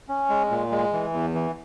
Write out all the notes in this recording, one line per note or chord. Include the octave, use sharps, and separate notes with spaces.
C#4
G#3
A#2
G#3
E3
E2
E3